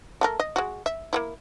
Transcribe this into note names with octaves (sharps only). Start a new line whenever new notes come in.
A3 A4 A#4
D#5
G#3 F#4
E5
A#3 B3 E4